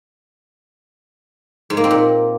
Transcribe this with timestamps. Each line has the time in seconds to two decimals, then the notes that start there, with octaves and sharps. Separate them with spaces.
1.70 G#2
1.77 A#3
1.84 C4
1.91 A#2